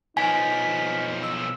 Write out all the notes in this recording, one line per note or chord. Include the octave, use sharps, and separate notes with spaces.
B1 F3 D#4 G#5 B6
E6